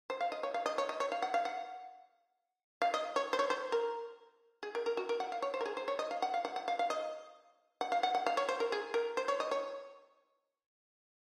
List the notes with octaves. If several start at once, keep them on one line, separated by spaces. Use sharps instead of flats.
C5
F5
D#5
C#5
F5
D#5
C#5
D#5
C#5
F5
F#5
F5
F#5
F5
D#5
C#5
C5
C#5
C5
A#4
G#4
A#4
A#4
F#4
A#4
F#5
F5
C#5
C5
A#4
G#4
C5
C#5
D#5
F5
F#5
F5
F#5
F#5
F5
F5
D#5
F#5
F5
F#5
F#5
F5
C#5
C5
A#4
G#4
A#4
C5
C#5
D#5
C#5